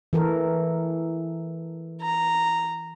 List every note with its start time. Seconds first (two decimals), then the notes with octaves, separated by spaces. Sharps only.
0.13 E3 A4 A#4
2.02 A#5